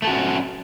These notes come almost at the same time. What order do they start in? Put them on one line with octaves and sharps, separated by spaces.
A3 A4 F#4 C#4